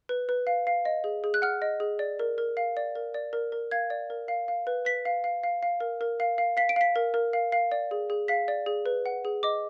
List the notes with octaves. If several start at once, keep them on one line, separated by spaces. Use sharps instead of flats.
B4
B4
F5
F5
D#5
G#4
G#4
F#6
F#5 F6
D#5
G#4
D5
A#4
A#4
F5
D5
A#4
D5
A#4
A#4
F5 G#6
D5
A#4
F5
F5
B4
B4 B6
F5
F5
F5
F5
A#4
A#4
F5
F5
F5 B6
D7
F5 B6
A#4
A#4
F5
F5
D5
G#4
G#4
F5 B6
D5
G#4
B4
F#5
G#4
D#5 D6